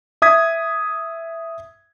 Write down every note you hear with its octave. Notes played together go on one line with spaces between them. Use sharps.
E5 D#6 G#6 B6